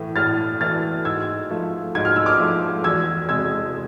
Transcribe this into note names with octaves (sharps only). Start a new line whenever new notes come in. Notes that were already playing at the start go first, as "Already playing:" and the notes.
Already playing: A2 E3 A3
A2 F6 A6
E3 A3 F6 A6
G#2 E6 G#6
F3 A3
G#2 G#6
F6
E6
D6 F6
F3 A3
E2 E6 G#6
C3 G#3 E6 G#6